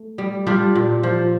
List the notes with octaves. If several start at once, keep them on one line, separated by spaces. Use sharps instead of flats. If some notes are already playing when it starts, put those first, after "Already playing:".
Already playing: A3
G3
G3 D4 F4
A#2
F3